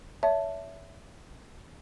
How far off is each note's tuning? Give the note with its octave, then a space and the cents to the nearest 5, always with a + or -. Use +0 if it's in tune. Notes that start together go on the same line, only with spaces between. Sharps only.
C#5 +35 E5 +0 A5 +0